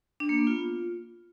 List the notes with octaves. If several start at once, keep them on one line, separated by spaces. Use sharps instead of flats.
D4
A#3
B3
F4